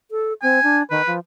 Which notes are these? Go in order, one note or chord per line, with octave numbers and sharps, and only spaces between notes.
A4
C4 G#5
D4
D#3 B4
F3